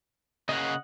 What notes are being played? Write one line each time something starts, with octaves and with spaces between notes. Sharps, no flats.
C#3 A#3 D#5 F#5